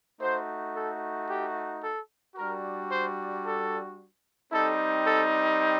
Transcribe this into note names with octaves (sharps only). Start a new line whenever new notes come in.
A3 D#4 F#4 C5
A4
G4
A4
G3 D4 F#4 A#4
C5
A4
G3 C4 D#4 A4
A4